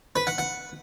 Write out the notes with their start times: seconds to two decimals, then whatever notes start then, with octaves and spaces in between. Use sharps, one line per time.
0.16 B4
0.27 F#5
0.38 F#5